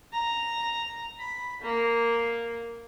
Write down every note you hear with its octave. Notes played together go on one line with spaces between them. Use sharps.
A#5
B5
A#3